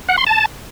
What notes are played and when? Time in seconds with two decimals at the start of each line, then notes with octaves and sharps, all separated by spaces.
0.09 F#5
0.18 C6
0.27 A5